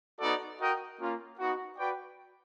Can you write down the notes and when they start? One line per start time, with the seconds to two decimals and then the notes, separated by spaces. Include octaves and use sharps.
0.20 B3 D#4 F#4 A4 D5
0.59 F#4 A#4 D#5 G5
0.99 A#3 C#4 F4
1.39 B3 D#4 F#4
1.77 F#4 B4 D5 G5